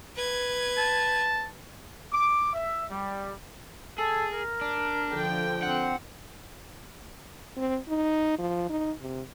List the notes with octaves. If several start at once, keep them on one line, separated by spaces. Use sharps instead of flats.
B4 G#6
A5
D6
E5
G3
G#4 A4
A#4
D4
D3 F3 G5
C4 F#5
C4
D#4
F3
D#4
C3